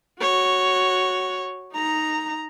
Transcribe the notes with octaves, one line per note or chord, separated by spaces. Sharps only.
F#4 C#5
D#4 A#5